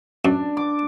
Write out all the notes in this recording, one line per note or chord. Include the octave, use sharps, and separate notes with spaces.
F#2 D4
D6